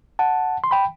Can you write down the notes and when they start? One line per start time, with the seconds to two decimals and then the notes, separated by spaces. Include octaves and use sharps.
0.19 F#5 A5
0.64 C6
0.71 G5 B5